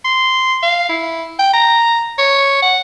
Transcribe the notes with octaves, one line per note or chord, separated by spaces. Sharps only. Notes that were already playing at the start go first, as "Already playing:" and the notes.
C6
F5
E4
G5
A#5
C#5
F#5